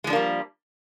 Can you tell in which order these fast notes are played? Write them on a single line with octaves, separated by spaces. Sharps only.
G#3 F3 D4 A#3 G3